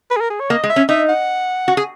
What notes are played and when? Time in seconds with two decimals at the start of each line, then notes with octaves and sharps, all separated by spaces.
0.11 B4
0.16 G#4
0.20 A#4
0.30 G#4
0.40 C#5
0.50 A#3 D#5
0.64 G#3
0.69 E5
0.76 C#4
0.89 D#4 E5
1.09 F#5
1.68 F#4
1.77 G#4